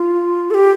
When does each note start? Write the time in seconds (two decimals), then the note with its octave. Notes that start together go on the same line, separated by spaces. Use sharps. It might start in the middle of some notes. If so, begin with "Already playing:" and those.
Already playing: F4
0.51 A4
0.54 G4